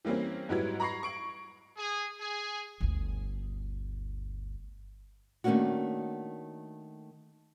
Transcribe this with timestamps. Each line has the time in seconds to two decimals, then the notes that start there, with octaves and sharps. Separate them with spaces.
0.05 E3 G3 A#3 C4 C#4
0.49 G#2 F#3 G3 E4 B4 G#6
0.80 A#5 B5 C#6 A#6 C7
1.03 C#6 D7 F#7
1.77 G#4
2.21 G#4
2.81 G1 D2
5.44 D#3 A3 A#3 C#4 D4 F#4